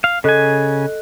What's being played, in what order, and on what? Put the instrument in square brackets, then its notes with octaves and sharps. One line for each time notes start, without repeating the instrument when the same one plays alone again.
[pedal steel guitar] F5
[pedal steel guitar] C#3 G#5 [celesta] A4 D#5 F#6